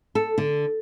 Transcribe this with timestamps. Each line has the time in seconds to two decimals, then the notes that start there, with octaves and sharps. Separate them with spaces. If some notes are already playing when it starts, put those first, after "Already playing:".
0.15 A4
0.38 D3